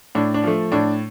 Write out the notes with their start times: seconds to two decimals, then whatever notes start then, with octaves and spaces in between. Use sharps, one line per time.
0.15 A2 D4
0.34 D4
0.44 F3 A3
0.72 A2 D4